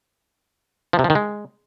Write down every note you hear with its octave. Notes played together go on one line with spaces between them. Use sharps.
F3
C3
F3
D#3
G#3